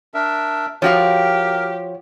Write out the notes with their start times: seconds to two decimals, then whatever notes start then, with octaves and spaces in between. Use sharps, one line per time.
0.14 D4 A#4 E5
0.82 F3 F#4 G4 A#4 C#5 F5